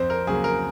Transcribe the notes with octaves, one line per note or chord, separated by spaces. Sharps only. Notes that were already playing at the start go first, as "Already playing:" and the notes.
Already playing: F2 C4 C5
A#4
C#3 F#3 A#3 G#4
A#4